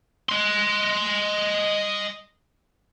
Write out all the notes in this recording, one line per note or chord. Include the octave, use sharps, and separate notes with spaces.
D#5 C6